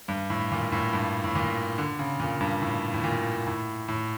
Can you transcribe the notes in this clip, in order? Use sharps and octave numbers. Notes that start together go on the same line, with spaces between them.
G2
A2
A#2
A2
G2
A2
A#2
D3
C#3
A#2
G2
A2
A2
A#2
A2
A2